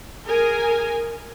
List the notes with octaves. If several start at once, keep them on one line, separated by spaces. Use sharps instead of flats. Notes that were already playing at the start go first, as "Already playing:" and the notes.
G#4 A#4 G#5